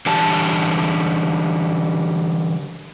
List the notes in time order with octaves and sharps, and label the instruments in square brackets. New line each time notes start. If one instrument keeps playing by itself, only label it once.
[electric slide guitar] D3 E3 G3 A5